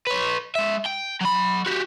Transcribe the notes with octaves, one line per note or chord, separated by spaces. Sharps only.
B4 C#5
G#3 E5
G5
F#3 B5
F#4 G4